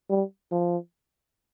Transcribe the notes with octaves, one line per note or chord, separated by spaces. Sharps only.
G3
F3